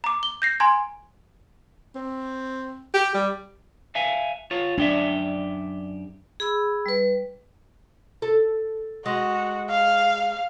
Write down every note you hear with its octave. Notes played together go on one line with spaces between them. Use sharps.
A#5 D6
G7
G6 A#6 C7
G#5 A#5 C6 G#6
C4
G4
G3
E5 F5 G#5
F4 C#5
F#2 D4 G4 E5
G#4 B5 E6
G3 B4
A4
G#3 F#4
F5